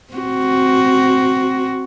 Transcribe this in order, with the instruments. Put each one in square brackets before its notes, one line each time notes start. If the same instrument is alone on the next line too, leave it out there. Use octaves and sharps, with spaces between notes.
[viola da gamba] C4 F#4